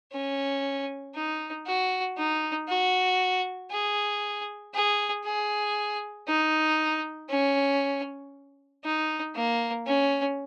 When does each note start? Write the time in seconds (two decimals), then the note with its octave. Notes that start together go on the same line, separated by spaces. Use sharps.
0.12 C#4
1.15 D#4
1.66 F#4
2.17 D#4
2.68 F#4
3.70 G#4
4.74 G#4
5.24 G#4
6.28 D#4
7.29 C#4
8.84 D#4
9.35 A#3
9.87 C#4